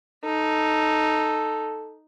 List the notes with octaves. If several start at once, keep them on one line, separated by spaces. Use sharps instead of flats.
D#4 A4